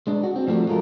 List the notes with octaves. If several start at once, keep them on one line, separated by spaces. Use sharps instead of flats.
G#3 D4
F#4
C4
F3 G3 A3 D#4 F#4
F3 G#3 F4 A4 A#4